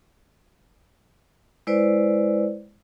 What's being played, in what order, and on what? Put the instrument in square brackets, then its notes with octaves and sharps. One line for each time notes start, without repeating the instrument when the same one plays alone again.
[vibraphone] G#3 E4 B4 C5 D5